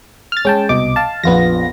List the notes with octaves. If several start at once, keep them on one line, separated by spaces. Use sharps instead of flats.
F6 A6
G#3 C#4 G5 A5
C2 B2 D#5 D6
F5 A5
A#1 F2 B3 F4 A#6